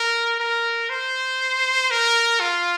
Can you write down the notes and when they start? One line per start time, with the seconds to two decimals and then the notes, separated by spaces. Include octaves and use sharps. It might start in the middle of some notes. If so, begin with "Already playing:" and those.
Already playing: A#4
0.39 A#4
0.90 C5
1.91 A#4
2.40 F4